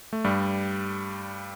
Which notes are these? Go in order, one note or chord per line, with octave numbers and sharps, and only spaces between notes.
A3
G2 G3